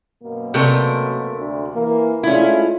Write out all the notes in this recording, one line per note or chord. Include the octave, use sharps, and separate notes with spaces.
F#2 B2 A#3
C3 A3 A#4
D2
E3 A#3
G#3 A3 C#4 E4 F4